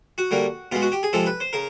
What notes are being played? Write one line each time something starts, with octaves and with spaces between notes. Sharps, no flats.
F#4
D3 G3 A#3
B2 G#3 F4
F#4
G4
G#4
C3 F3 G#3 A4
B4
C5
C#3 A#4